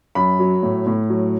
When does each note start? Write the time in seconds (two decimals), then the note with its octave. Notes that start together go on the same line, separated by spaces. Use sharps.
0.15 F#2 B5
0.39 F#3
0.63 A2
0.86 A2
1.09 F#3